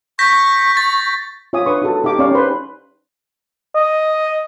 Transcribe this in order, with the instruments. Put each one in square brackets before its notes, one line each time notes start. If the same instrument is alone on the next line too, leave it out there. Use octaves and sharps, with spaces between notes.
[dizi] C#6 [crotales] G6 A#6 B6
[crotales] A6
[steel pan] F4 C#5 E5 G#5 D#6
D4 B4 C#5 C6 C#6 D#6
D#4 F#4 A4
D#4 G4 F5 D6
C#4 D#4 G4 D5 F5 C#6
B4 C5 B5 C6
[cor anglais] D#5